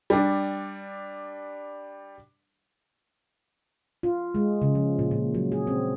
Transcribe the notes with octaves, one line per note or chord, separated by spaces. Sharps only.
G3 D4
F4
G#3
C#3
F3
A#2
A#2
F#3
G#4
C4